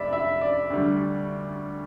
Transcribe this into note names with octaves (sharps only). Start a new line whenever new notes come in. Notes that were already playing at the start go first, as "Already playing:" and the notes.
Already playing: F1 D5 E5 B5
E5
D5
D2 D3 G3